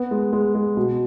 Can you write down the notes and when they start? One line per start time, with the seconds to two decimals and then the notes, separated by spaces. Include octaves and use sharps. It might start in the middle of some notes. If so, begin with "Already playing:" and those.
Already playing: B3
0.11 G#3
0.33 G#3
0.55 G#3
0.77 B2